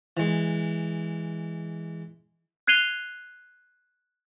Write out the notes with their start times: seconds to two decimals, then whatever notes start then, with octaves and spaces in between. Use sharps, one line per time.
0.17 E3 G#3
2.67 F#6 G#6 C7 D#7 F7 G7